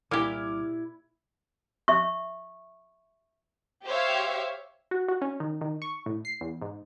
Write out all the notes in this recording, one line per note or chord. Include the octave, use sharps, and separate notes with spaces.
C2 A#2 E4 G4 D6 F6 G#6
E5 C#6
G4 C5 C#5 E5 F5
F#4
F#4
C#4
D#3
D#3
C#6
A2
C7
E2
G#2